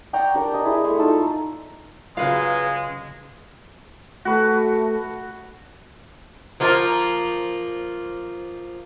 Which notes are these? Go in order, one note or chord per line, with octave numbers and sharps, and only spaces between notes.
D5 G5 A#5 C#6
D4 G4 A#4
D#5
E4 G#4
A3 C6 C#6
D#4 F4 A4
C#3 F#3 G#3 F4 B4 F5
A3 F#4 B4
F3 A#3 F4